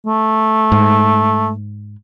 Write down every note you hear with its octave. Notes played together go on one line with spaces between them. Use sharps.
A3
G#2